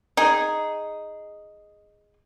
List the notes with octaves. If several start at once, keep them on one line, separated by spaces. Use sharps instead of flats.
D#4 G#4